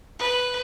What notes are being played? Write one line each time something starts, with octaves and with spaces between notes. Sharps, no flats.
B4